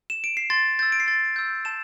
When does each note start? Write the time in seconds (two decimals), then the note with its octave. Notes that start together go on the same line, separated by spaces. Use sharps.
0.10 E7
0.24 D7
0.37 C7
0.50 C6 A6
0.79 E6 G6 A6
0.92 D7
1.00 C7
1.07 C6 A6
1.36 E6 G6
1.65 A5 E7